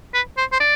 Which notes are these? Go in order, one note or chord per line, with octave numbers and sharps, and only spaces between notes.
B4
C5
C5
D5